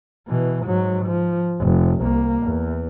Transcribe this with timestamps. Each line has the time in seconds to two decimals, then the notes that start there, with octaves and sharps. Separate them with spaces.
0.27 B2 E3
0.66 G#2 F#3
1.06 F3
1.59 F1
2.01 C2 A#3
2.43 E2